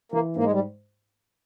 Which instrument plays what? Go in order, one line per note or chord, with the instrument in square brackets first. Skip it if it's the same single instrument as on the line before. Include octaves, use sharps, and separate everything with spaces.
[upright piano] E3 [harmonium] A#3
[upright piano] G#2 [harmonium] A#3
[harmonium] G#3
G3